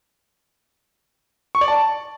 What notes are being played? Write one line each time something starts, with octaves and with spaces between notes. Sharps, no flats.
C#6
D5
A5